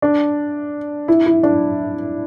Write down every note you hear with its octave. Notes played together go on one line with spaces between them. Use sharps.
D4
E4
E4
D4